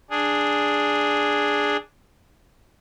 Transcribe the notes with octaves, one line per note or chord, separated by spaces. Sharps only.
D4 G#4